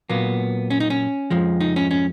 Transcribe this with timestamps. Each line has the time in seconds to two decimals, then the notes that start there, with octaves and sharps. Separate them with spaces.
0.09 A#2 F#3 A#3 B3
0.70 C#4
0.80 D#4
0.90 C#4
1.30 F2 F3 G#3
1.61 D#4
1.76 C#4
1.91 C#4